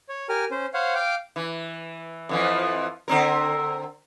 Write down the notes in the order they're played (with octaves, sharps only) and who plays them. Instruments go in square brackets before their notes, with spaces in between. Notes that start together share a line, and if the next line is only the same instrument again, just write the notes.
[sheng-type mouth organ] C#5
G4 A#4 G#5 F6
C#4 C5
C5 C#5 F5 F#5
F5 G5 D6
[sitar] E3
F2 E3 F3
D3 C4 A#4